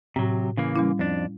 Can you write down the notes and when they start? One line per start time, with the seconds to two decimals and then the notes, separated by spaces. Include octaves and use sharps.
0.16 A2 C3 F#3
0.57 C#3 E3 A#3
0.76 G3 C#4 E4
0.99 F2 D4